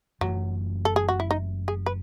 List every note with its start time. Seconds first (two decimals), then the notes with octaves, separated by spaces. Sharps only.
0.21 F#1 F#2 E3 F#3 A3
0.85 A4
0.96 G#4
1.09 F#4
1.20 E4
1.31 D#4
1.68 G#4
1.86 B4